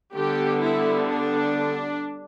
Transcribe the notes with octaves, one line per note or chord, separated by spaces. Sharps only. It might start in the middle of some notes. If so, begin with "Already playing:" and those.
D3 G3 B3 G4
E4
D4